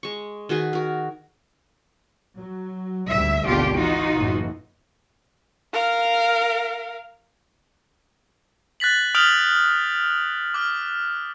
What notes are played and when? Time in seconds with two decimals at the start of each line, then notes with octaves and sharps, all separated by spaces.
0.03 G#3 C#6
0.49 D#3 F#4 G#4 B4
0.73 F#4 A#4
2.39 F#3
3.09 D2 G#2 G3 E5
3.45 G#1 D2 B2 D3 F4 G4
3.77 E3 D#4 F4 F#4
4.14 F#1 A2 E3
5.73 A#4 F5
8.80 F#6 A6 B6 F#7
9.15 D#6 F6 G6 D7 F7 F#7
10.54 D6 F6